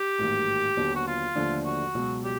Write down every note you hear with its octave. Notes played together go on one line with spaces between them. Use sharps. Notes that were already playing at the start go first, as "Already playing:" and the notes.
Already playing: G4
A1 G#2 D#3 F#3 A#3
D#2 D3 F#3 B3
F#4
F4
D#2 D3 F3 A3 D4
F#4
C#2 B2 F#3
G4